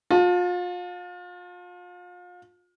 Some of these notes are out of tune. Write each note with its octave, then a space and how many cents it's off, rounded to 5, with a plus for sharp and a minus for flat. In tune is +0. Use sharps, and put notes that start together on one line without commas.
F4 +35 A5 +0